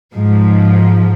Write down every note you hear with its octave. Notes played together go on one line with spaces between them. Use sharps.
G#2 F3